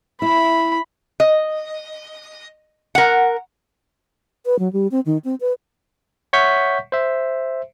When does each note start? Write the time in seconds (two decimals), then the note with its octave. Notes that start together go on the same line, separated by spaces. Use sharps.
0.22 E4 B5
1.20 D#5
2.95 A#4 F#5
4.46 B4
4.59 F#3
4.73 G3
4.91 C4
5.06 D#3
5.24 C4
5.41 B4
6.33 C#5 E5 F#5 C#6 G6 B6
6.92 C5 E5